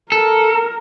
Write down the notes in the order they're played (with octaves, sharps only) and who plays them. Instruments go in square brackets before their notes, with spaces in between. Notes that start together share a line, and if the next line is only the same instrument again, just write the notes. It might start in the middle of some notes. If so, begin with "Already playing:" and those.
[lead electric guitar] A4 [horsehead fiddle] A#4